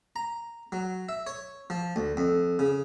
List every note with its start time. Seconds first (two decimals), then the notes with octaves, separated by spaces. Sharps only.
0.16 A#5
0.72 F#3
1.09 E5
1.27 C#5
1.70 F3
1.96 D2
2.17 F2
2.59 C#3